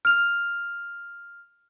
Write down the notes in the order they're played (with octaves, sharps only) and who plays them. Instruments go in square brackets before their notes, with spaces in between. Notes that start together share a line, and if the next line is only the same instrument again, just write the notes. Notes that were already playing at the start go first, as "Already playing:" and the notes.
[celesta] F6 F7